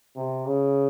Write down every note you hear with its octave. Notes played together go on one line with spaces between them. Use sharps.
C3
C#3